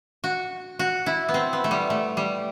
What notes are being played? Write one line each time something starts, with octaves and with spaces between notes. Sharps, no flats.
F#4
F#4
E4
B3
C4
B3
A3
G3
A3
G3